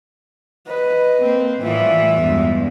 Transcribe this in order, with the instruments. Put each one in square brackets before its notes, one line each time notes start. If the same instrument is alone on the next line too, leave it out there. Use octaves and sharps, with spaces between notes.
[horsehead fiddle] B4 D#5
[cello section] A#3 C4
[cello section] A2 E3 G3 [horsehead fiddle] F4 E5
[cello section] E2 G2 G#3